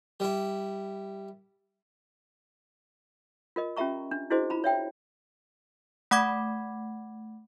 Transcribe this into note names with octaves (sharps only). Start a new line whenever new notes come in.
G3 E4
F4 A#4 D#5
C#4 F4 G4 E5 A#5 C#6
D4
D4 E4 F#4 G#4 C5 D#5
F4 A#5 B5
C#5 E5 G5
A3 F#5 B5 D6 G#6